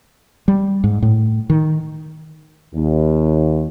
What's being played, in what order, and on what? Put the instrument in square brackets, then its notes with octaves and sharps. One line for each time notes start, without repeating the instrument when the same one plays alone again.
[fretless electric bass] G3
G#2
A2
D#3
[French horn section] D#2